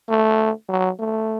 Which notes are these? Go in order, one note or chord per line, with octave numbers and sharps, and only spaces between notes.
A3
F#3
A3